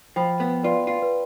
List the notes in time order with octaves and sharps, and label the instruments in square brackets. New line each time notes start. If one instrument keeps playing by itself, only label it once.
[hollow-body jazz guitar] F3 [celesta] G5 B5
[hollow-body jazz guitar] B3
[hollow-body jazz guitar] F4 [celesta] B4 D5
[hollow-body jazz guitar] F4
[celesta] B4